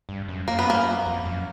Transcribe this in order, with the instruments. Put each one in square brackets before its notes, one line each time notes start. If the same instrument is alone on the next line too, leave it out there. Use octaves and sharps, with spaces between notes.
[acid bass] G2
F#2
[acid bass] F#2 [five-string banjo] A#3
[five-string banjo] B3
[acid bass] G2 [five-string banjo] A#3
[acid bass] F#2
F2
F#2